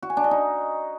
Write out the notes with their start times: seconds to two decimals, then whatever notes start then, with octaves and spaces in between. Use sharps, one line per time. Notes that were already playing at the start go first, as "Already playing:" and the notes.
0.02 F#4
0.10 G#5
0.17 D4
0.24 D#5
0.31 D#4